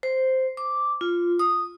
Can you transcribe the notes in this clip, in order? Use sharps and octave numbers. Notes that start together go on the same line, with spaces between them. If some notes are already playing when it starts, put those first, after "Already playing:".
C5
D6
F4
D#6